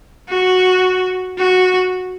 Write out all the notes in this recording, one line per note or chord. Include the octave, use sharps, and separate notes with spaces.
F#4
F#4